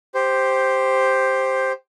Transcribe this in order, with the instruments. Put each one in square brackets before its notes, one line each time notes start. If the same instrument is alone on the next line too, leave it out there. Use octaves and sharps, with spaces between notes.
[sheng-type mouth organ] G4 C5